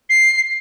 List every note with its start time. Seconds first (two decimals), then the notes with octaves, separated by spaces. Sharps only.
0.10 C7